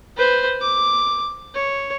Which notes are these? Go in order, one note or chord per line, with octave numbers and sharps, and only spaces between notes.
B4 C5
D6
C#5